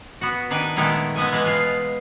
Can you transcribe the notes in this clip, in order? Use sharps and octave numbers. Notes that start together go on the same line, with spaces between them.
B3 F#4
D#3 D4 B4 G#5
A#2 D#3 G#3 A3 B3
G#3 A3 B3 E5 G#5
E3 G#3 B4 E5
B2 F4